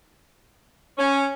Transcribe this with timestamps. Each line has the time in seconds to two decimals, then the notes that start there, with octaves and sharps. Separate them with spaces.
0.98 C#4